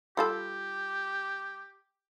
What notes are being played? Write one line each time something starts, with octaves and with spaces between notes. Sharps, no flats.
G3 F4 G4 A4